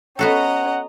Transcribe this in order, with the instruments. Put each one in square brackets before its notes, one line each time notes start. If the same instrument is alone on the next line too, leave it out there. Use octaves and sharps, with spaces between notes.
[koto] B3 F#4 A4 [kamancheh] C#4 [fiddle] D#5 A#5 [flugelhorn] F#5